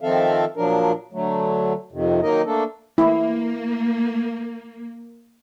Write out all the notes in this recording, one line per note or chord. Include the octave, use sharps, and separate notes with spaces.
D#3 F3 C4 A4 E5 F5
A#2 F3 F#3 D4 A#4
D3 F#3 A3
F2 C3 D#3
D#3 F#3 A#3 D#4 A#4 D#5
A3 A#3 D4 A4
A#3 E4